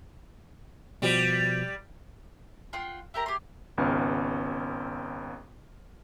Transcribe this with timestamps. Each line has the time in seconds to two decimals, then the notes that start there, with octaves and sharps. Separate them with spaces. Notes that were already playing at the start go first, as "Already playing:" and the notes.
1.02 B2 F3 G3 G4
2.73 F4 F#5 G5 C6
3.14 E4 G4 A#4 A#5
3.26 G4 G#4 C6
3.77 G#1 C#2 B3 C#4 F6